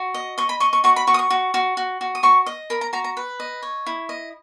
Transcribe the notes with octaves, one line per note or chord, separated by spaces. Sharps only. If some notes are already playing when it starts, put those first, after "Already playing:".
Already playing: F#4
D#5
D#5 C#6
B5
D#5 C#6
C#6
F#4 C#6
B5
F#4 C#6
D#6
C#6
F#4
F#4
F#4
F#4
D#6
F#4 C#6
D#5
A#4 B5
A#5
F#4 A#5
A#5
B4
D#5
C#5
E4
D#5